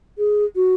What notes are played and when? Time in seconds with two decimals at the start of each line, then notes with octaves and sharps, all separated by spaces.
0.18 G#4
0.56 F#4